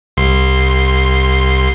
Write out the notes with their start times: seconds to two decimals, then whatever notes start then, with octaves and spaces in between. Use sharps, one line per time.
0.17 C2 C6